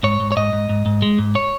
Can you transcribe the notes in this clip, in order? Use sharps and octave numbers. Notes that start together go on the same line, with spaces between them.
G#2 C#5
G#2
C#5
G#2 D#5
G#2
G#2
G#2
G#3
G#2
C#5